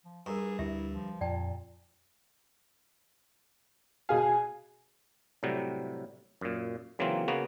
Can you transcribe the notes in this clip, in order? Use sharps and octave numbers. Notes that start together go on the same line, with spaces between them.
F3
G2 G#4 A#4 A#5 C#6
D2 D4 E4 G4 E5
F3
F2 A#2 D5 G5 A5
B2 G#4 F5 G#5
A2 C3 F#3 G3
F#2 A#2
C#3 E3 F#3 A#3 C4 F4
C#3 A#3 B3 F#4